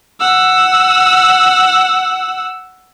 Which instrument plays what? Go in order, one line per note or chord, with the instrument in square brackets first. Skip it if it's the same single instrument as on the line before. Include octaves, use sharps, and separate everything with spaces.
[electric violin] F#5 E6